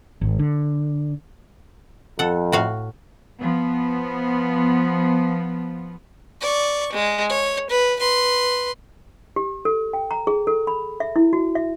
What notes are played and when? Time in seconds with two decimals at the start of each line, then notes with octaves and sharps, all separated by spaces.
0.21 G#1
0.39 D3
2.19 F2 A4 F#5
2.52 A2 F#4 F5
3.40 F3 B3
6.41 D5 C#6
6.93 G#3
7.29 C#5
7.70 B4
8.00 B4 C6
9.36 G4
9.65 A4
9.93 G5
10.11 A#5
10.27 G#4
10.47 A4
10.67 B5
11.00 E5
11.16 E4
11.33 F#4
11.55 E5